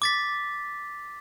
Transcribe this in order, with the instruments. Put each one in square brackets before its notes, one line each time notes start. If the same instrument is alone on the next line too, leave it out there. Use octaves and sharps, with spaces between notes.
[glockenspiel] D6 A6 B6